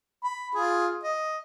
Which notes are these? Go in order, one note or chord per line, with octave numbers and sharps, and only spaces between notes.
B5
F4 G#4
D#5